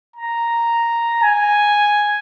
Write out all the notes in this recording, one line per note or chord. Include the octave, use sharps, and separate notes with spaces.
A#5
G#5